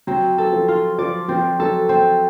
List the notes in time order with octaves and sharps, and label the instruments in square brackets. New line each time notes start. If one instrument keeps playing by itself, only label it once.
[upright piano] F#3 [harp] C4
[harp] A4
[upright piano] F3
[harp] F4
[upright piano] F3 [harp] D5
[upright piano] F3 [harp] C4
[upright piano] F#3 [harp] A4
[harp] C4